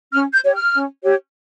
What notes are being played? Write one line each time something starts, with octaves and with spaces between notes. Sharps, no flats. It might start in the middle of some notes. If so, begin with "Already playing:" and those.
C#4 F6
G6
G4 C#5
F6
C#4
G4 C#5